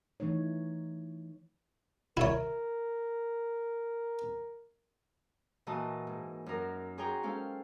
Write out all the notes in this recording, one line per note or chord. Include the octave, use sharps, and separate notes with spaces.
E3 A3 D#4 C#5
E4 A#4 C#5
A#2 E3 F#4 A#4 D#5 A5
G#2
F#2 D#4 A#4
F#4 G#4 C#5 G5 A#5 C6
G#3 C#4 A4 C5 F5 G5